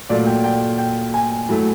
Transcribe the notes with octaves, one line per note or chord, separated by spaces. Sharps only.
A#2 F#3 A3 D5
G5
G5
G5
G#5
A2 F#3 A3